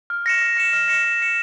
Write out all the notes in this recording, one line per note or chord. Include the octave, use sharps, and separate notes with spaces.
F6
A#6 C#7 E7
F6
A#6 C#7 E7
F6
A#6 C#7 E7
F6
A#6 C#7 E7